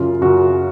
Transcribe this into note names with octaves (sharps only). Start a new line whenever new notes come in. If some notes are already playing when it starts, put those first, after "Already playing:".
Already playing: F#2 C#3 F4
F#2 C#3 F#4